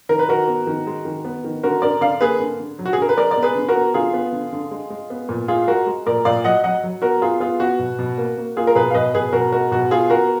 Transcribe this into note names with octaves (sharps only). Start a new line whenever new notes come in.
D#3 A#4
B4
D#3 F#4 A#4
B3
D#3
G#3
D#3
B3
D#3
D3 F#4 A#4
D3 A#4 D5
D3 D5 F5
A#3 G#4 B4
D3
D3
F#3
F#4
G#4
D3 A#4
B4
G#3 A#4 D5
D5
B3
G#4 B4
D3
F#4 A#4
B3
D3 F4 G#4
B3
D3
D3
G#3
G#3
B3
A#2
G#3 F4 G#4
G#3 F#4 A#4
G#3
A#2 A#4 D5
A#2 D5 F5
F#3 D#5 F#5
F#3 D#5 F#5
F#3
B3 F#4 A#4
B3 F4 G#4
B3 F4 G#4
B3 F#4
B2
B2
A#3
A#3
A#3 F4 G#4
A#4
B2 G#4 B4
F5
B2 B4 D#5
B2 G#4 B4
B2 F#4 A#4
G#3 F#4 A#4
B2 F#4
B3 F4 G#4
B3 F#4 A#4